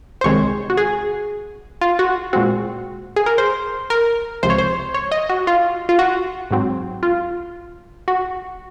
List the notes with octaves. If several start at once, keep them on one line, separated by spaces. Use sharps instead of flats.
C5
C2 C3 D#3 G#3 C4 C#5
F#4
G#4
F4
F#4
A#2 G#3 C4 F#4
G#4
A#4
C5
A#4
C#2 C3 F3 C5
C#5
C5
C#5
D#5
F#4
F4
F4
F#4
G#2 F#3 C4
F4
F#4